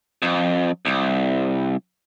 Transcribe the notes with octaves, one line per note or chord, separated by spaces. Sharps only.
F2
C2